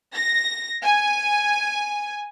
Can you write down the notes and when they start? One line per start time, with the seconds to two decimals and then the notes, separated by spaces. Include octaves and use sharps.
0.14 A#6
0.83 G#5